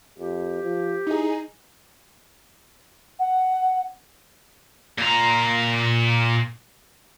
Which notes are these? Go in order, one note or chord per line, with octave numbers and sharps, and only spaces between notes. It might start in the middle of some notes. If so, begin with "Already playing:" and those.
F2 G4
F3
D#4 E4 G#4
F#5
A#2 A#5